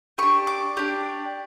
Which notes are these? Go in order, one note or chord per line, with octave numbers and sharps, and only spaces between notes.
D4 G4 C#6
D6
D4 G4